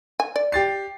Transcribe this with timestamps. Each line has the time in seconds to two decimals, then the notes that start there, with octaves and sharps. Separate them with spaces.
0.20 G#5
0.36 D5
0.52 G4 A6 C7